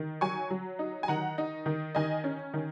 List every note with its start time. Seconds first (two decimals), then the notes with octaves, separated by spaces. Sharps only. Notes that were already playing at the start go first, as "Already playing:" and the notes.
Already playing: D#3
0.21 F#3 G#5 C#6
0.50 F#3
0.79 D#4
1.03 G#5
1.08 D#3 F#5 A#5
1.38 D#4
1.66 D#3
1.95 D#3 D#5 G#5
2.24 C#4
2.54 D#3